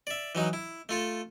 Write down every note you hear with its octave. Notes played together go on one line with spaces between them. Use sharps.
D5 E5
E3 F#3 D#4
E4
A3 F4 A4